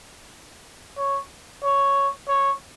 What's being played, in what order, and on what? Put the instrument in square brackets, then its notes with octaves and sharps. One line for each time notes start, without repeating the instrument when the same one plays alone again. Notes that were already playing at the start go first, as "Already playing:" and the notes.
[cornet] C#5
C#5
C#5